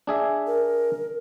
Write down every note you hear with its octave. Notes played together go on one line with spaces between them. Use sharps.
D4 G#4 E5
A#4